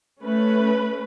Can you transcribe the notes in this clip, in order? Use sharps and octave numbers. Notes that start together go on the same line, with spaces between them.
A3 C#4 B4